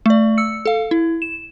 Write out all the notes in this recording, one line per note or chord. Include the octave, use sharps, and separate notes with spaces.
A3 D5
E6 C#7
A4 F5
E4
E7